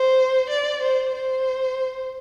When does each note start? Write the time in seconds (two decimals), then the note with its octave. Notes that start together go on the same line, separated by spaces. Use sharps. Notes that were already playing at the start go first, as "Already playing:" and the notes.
Already playing: C5
0.50 D5
0.83 C5
1.15 C5